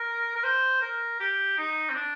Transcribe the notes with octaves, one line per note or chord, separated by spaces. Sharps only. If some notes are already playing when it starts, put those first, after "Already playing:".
Already playing: A#4
A#4
C5
A#4
G4
D#4
C4
D4